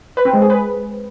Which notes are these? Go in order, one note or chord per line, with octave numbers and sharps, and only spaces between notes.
B4
C4
G#3
G#4
B4